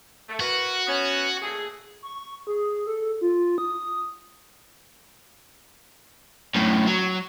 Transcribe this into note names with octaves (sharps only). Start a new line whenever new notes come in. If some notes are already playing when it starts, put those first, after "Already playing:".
A3
E4 F#4 A#4 B4
B3 C#4
A#2 A3 G#4
C#6
G#4
A4
F4
D#6
F#2 A2
F#3